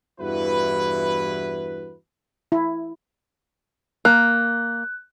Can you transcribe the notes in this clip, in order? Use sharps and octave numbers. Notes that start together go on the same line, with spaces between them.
E2 G2 E3 E4 F#4 B4
E4
A#3 F#6